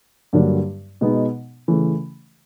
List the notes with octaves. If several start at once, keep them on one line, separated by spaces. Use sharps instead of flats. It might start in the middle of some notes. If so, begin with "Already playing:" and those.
G2 D3 F#3 A#3 D4
B2 G#3 B3 D#4
C#3 E3 A3